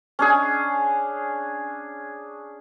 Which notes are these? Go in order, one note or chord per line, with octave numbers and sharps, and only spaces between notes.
C#4 D4 G#4